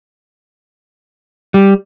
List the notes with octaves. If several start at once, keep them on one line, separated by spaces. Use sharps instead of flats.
G3